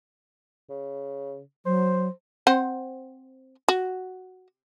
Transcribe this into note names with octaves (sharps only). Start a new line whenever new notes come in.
C#3
F#3 C5
C4 C5 F#5
F#4